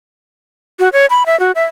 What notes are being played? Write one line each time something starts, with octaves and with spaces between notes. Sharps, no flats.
F#4
C#5
B5
E5
F#4
E5